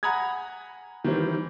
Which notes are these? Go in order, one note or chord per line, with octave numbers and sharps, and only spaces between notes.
F#5 G#5 A#5 B5 D#6 G#6
D#3 E3 G3 C4